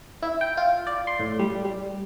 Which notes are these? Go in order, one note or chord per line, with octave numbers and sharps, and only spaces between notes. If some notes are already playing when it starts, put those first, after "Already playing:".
E4
G5
F4
D5
C6
A2
G3
G3